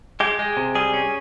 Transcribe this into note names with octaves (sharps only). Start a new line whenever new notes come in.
G#3 G4
G#3
C3
G3 G#4
C#4